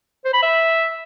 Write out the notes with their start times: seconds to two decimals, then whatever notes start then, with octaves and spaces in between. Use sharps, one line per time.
0.25 C5
0.34 B5
0.43 E5